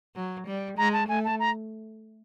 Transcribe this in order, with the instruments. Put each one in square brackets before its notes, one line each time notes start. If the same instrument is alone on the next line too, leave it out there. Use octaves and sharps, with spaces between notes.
[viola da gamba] F#3
G3
[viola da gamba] G#3 [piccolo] A#5
[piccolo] A5
[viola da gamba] A3 [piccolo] G#5
[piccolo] A5
A#5